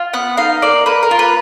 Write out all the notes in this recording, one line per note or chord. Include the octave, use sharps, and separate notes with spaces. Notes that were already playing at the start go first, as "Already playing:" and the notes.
Already playing: F4
B3 F#5
D#4 F5
A#3 D5
A#3 B4
A#4
F4
B4